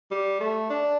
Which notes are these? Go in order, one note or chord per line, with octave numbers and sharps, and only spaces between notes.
G3
A3
D4